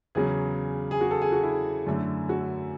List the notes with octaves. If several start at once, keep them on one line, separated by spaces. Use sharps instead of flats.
E2 C#3 F#3 C#4 G#4
G#4
F#4
A4
G#4
F#4
E4
F#2 D3 A3
F#4